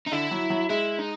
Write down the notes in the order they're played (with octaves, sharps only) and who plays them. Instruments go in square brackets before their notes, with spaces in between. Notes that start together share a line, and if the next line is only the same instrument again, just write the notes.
[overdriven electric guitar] D#4
[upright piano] D3 [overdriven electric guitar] E4
[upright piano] F#3
F#3
[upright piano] G#3 [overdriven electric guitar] E4
[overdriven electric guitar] D#4